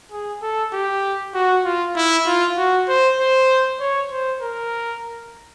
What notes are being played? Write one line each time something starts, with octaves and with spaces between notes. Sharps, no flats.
G#4
A4
G4
F#4
F4
E4
F4
F#4
C5
C5
C#5
C5
A#4